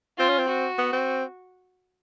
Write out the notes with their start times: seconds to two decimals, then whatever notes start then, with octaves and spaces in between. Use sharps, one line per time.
0.18 C4 F4
0.29 C#4
0.39 C4
0.49 F#4
0.78 B3
0.93 C4